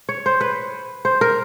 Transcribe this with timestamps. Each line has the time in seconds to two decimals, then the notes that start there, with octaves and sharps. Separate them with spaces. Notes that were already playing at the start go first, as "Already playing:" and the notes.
0.09 C#5
0.26 C5
0.41 B4
1.05 C5
1.21 A#4